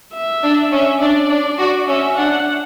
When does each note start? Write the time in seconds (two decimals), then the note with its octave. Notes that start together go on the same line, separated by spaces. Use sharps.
0.13 E5
0.42 D4
0.72 C#4 E5
1.01 D4 D5
1.29 D4
1.59 F#4
1.88 C#4 E5
2.17 D4 F#5